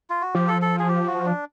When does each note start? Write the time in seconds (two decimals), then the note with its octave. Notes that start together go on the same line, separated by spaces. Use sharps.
0.10 F4
0.22 F#4
0.35 F3 G4
0.48 A4
0.62 A4
0.79 G#4
0.89 G4
1.07 F#4
1.26 D4